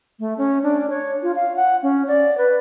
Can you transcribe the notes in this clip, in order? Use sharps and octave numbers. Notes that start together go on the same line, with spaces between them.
A3
C#4
D4
C#5
F4
F5
F#5
C#4
D5
B4